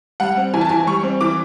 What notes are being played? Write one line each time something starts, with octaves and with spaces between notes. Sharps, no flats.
G3 F#5
C4
E3 G#5
A5
E3 G#5
G3 C#6
C4
E3 D6